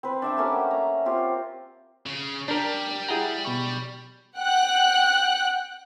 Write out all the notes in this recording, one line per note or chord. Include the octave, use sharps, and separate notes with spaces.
C4 B4
D4 E5 G5
A3 A#3 C#4 G4
F#5
A#5
C4 F4 G4
C#3
G3 D4 A#4
E4 G4 G#4 F#5 G5 A#5
B2 B5 C#6
F#5 G5 F#6